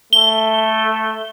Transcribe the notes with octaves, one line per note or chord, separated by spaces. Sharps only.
A3 G7